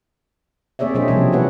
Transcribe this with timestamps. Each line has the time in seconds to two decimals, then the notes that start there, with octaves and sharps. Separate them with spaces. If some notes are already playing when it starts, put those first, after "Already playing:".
0.79 A#3 C4 G#4 C#5 D5 E5
0.95 B2 F#3 D4 G#4 C5 D#5
1.08 C3 F3 G3 C4 C#4 G#4
1.32 E3 B3 C4 B4 C#5 F#5